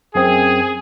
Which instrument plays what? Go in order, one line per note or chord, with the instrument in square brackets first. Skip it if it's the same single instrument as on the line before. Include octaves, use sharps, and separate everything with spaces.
[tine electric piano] F#2 C4 [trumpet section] G#4